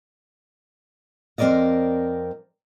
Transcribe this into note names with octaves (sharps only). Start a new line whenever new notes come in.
F2 C4 G#4 A#4 D5 D#5